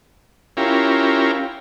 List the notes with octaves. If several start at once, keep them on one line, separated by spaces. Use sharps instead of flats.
C#4 E4 F4 G4 A#4